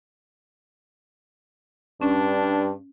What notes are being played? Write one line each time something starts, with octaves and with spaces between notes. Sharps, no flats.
G2 C#4 D4